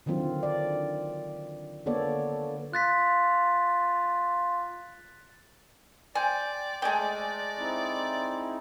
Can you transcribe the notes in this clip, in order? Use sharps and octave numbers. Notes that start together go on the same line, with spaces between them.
D3 D#3 F#3 C4 F4
D5
D3 A#3 B3 A4 C#5 D5
F4 F#6 A6 B6
C5 D5 G5 G#5
G#3 A3 D#5 G5 G#5
C4 D#4 E4